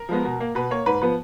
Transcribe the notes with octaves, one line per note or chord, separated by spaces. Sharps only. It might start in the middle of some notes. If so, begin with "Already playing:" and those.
Already playing: A#4
F3 G#3 B3
B2
A#3
B2 B4
A#3 C#5
G#2 B4
F3 B3 B4